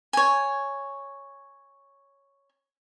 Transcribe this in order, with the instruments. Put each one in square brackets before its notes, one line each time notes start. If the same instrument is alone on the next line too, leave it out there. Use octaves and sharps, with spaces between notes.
[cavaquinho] C#5 G#5